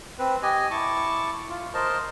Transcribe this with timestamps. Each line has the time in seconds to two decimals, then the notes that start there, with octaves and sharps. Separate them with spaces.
0.19 C4 B4
0.43 G4 D#5 G#5
0.71 E4 A5 C#6 D6
1.50 F4
1.74 A#4 C5 D#5 A5